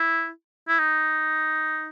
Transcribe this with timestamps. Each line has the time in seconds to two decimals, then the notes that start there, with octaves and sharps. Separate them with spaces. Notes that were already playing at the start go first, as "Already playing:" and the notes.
Already playing: E4
0.68 E4
0.79 D#4